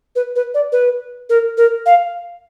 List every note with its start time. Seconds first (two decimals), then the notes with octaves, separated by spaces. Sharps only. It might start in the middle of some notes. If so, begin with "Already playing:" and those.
0.16 B4
0.36 B4
0.54 D5
0.72 B4
1.29 A#4
1.57 A#4
1.86 F5